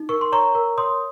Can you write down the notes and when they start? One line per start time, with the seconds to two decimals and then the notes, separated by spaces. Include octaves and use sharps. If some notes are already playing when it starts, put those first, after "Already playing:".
Already playing: D#4
0.09 A#4 C#6
0.21 C6
0.32 C#5 A#5 C#6
0.55 A#4
0.78 C#5 C6 D#6